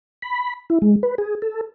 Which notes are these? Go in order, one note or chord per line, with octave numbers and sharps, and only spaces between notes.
B5
E4
G#3
B4
G#4
A4